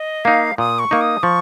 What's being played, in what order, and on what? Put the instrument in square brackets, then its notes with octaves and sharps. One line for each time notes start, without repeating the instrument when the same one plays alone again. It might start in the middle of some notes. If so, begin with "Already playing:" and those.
Already playing: [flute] D#5
[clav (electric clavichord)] A#3 D#4 [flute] F5
[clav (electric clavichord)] A#2 [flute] D#6
[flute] C#6
[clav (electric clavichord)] A#3 D#4
[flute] D#6
[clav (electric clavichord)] F3 [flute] C#6